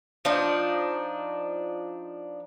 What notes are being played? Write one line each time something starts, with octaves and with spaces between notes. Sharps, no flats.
F3 D4 D#4